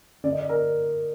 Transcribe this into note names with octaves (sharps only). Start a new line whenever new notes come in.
D3 D5
D#5
D5
A#4